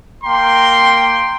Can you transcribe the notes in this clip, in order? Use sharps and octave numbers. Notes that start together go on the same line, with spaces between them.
A#3 G5 A#5 C6